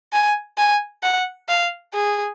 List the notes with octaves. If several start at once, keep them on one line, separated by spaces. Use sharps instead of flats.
G#5
G#5
F#5
F5
G#4